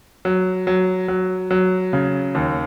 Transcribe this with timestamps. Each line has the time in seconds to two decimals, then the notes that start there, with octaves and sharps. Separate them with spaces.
0.25 F#3
0.67 F#3
1.08 F#3
1.51 F#3
1.93 C#3
2.35 D#2